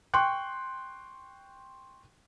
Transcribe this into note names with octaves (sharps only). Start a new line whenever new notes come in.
G5 C6 C#6 F#6